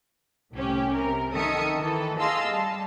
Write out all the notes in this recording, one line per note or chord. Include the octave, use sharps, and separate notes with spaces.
C2 A2 C#4 G4
C3 A#4
D#3 A4 E5 D#6 C#7
D#3 E3 A4
G#4 D#5 F5 A5 C6 E6
G3 A5